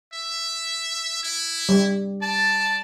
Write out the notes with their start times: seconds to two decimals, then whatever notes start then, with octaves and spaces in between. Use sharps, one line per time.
0.13 E5
1.24 E4
1.69 G3
2.22 D5 A5